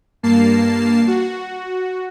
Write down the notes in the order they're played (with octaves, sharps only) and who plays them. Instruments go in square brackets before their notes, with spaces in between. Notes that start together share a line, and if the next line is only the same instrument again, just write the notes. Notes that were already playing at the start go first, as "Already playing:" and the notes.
[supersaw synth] G2 A#3 A5 C7
F#4